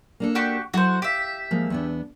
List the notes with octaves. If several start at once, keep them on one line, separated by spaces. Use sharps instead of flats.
A#3 D4 A4
F#4 G4 C#6
F#3 E4 F#4 A4 C5
G4 E5 F5
F3 G#3 A#3
E2 B3 D4